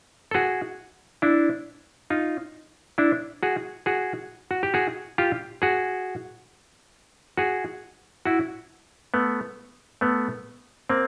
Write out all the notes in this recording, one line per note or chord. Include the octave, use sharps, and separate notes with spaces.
A4
F#4 G#4
D4 E4
D#4 F4
D4 E4
F#4 G#4
F#4 G#4
F#4
G4
F#4 G#4
F4 G4
F#4 G#4
F#4 G#4
E4 F#4
A3 B3
A3 B3
A#3 C4